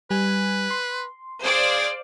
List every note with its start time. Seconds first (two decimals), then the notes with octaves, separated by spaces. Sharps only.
0.11 G3 B4 G#5 G#6
0.70 C6
1.44 G#4 C5 D5 F5